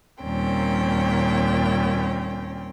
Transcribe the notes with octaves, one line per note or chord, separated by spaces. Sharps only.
D#2 A#2 G3 C4 C#4 G5